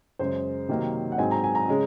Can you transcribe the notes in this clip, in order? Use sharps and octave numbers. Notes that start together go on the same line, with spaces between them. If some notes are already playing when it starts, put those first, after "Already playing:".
F#2 C#3 G#3 C5
C3 D#3 F#3 A#3
F#5
G#2 F#3 C4 D#4 G#5
A#5
G#5
A#5
C#3 G#3 C#4